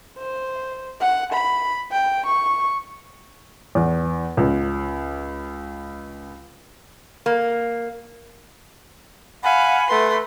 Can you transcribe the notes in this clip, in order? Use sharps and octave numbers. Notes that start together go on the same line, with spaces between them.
C5
F#5
B5
G5
C#6
E2
C#2
A#3
F5 F#5 G#5 B5
A3 B4 C6